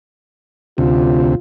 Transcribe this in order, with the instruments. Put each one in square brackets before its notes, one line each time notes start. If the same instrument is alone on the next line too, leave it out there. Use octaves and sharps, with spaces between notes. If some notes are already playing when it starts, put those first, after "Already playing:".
[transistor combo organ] D2 C3 [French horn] F4